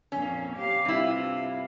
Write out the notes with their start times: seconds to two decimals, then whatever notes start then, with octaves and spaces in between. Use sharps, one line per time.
0.12 F2 A#2 C#4
0.56 G4 F5
0.85 G2 C3 E4 F4